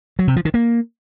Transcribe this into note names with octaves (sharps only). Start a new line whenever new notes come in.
F#3
C3
F3
D#3
A#3